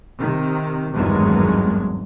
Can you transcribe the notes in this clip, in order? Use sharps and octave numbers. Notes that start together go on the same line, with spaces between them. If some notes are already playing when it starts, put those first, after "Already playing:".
C3 D#3
G#1 E2 G2 D#3 F#3 G#3